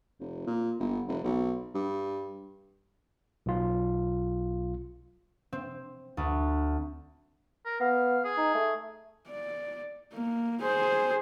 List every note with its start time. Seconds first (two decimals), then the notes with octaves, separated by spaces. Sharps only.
0.20 F1
0.47 A#2
0.79 G1
1.08 F1
1.23 B1
1.74 G2
3.46 B1 F4
5.52 C4
6.17 D2
7.65 A#4
7.80 B3 F5
8.24 G#4
8.38 D#4
8.55 A3
9.28 D5
10.13 A#3
10.62 G#4 C5